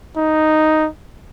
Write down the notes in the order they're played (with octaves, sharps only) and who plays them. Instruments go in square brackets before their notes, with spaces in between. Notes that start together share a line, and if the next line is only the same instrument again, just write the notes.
[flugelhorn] D#4